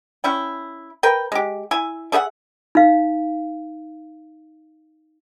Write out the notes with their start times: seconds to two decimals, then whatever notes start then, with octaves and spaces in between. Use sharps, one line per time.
0.24 C#4 E4 G5
1.03 A#4 B4 G5
1.32 G#3 G4
1.71 E4 E5 G#5
2.12 A3 G#4 E5 F#5
2.75 D#4 F5